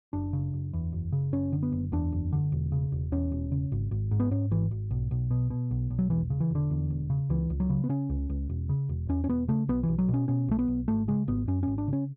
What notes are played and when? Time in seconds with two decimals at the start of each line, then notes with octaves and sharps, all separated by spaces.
0.13 F#1 D4
0.33 C#3
0.53 F#1
0.73 E2
0.92 F#1
1.12 C#3
1.32 F#1 C#4
1.52 D3
1.63 B3
1.72 F#1
1.92 E2 D4
2.12 F#1
2.32 D3
2.52 E1
2.72 C#3
2.92 E1
3.12 E2 C#4
3.32 E1
3.52 C#3
3.72 G#1
3.91 G#1
4.11 G#2
4.20 B3
4.31 G#2 C#4
4.51 G#1 E3
4.71 G#1
4.91 B1
5.11 B1
5.31 B2
5.50 B2
5.71 B1
5.90 B1
5.99 F#3
6.10 E1 E3
6.30 C#3
6.40 E3
6.50 E1 D3
6.70 E2
6.90 E1
7.10 C#3
7.29 C#2 E3
7.50 C#2
7.60 F#3
7.70 C#3
7.84 B3
7.89 C#3 C#4
8.10 C#2
8.29 C#2
8.49 E1
8.69 C#3
8.89 E1
9.09 E2 C#4
9.24 C#4
9.29 E1 B3
9.48 C#3 A3
9.68 B1 B3
9.83 B1 E3
9.99 F#3
10.09 B2
10.14 C#4
10.28 B2 C#4
10.48 B1 A3
10.59 B3
10.68 B1
10.88 G#1 A3
11.08 C#3 G#3
11.28 G#1 B3
11.48 F#2 C#4
11.63 G#1 C#4
11.78 D4
11.88 C#3 C#4